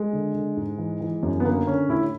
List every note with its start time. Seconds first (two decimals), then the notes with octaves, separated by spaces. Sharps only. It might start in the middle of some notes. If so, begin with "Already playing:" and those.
Already playing: G#3
0.13 D3
0.34 D3
0.57 G#2
0.78 E3
1.00 E3
1.23 F#2
1.40 B3
1.44 D3 A#3
1.67 D3 C#4
1.89 A2 E4